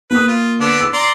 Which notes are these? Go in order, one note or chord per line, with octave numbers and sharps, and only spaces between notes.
A#3 B4 D#6
F4
D3 B3 D4
E6
D5 A#5 C6